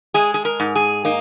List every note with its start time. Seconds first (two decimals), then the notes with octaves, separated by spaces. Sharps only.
0.14 G#3 G#4
0.34 G#4
0.45 A#4
0.60 G#2
0.75 G#4
1.05 A#3 D#4